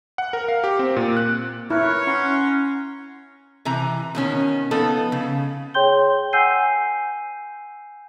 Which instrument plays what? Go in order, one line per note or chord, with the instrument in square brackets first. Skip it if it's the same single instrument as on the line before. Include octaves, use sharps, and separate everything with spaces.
[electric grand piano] F#5
A#4
F5
G4
C4
A#2
F#6
[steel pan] E4 [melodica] A#4 B4 [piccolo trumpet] C#5
[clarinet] C#4 [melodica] F#5 A#5 C6
[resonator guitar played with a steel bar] C3 E3 A#5
B2 D#3 C#4
F3 B3 D#4 A4
C#3
[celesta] G#4 C#5 G5 C6 G6 G7
F#5 G#5 E6 G6 C7 D#7